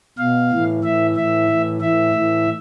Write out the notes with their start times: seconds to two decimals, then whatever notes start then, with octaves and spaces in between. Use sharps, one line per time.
0.18 B2 F5
0.51 A2 E3
0.84 A2 E3 E5
1.16 A2 E3 E5
1.49 A2 E3
1.81 A2 E3 E5
2.14 A2 E3